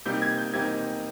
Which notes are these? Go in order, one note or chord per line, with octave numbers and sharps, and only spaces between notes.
C3 G3 A#3 D#4 G6
G#6
G6
C3 G3 A#3 D#4 G#6